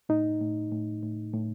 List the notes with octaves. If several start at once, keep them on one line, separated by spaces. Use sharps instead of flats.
A2 D#4
A2
A2
A2
A2